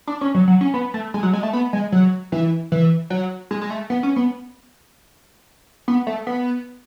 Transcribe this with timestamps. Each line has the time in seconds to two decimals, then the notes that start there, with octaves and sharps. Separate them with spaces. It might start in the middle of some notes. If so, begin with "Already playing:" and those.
0.07 D4
0.21 C#4
0.34 F#3
0.48 F#3
0.61 C#4
0.74 B3
0.94 A3
1.14 G#3
1.23 F#3
1.33 G#3
1.43 A3
1.53 B3
1.73 G#3
1.92 F#3
2.32 E3
2.72 E3
3.10 F#3
3.51 G#3
3.61 G#3
3.70 A3
3.90 B3
4.03 C#4
4.16 B3
5.88 B3
6.07 A3
6.27 B3